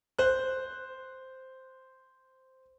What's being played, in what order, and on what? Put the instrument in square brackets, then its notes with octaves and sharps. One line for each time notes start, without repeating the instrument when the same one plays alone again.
[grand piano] C5 F#6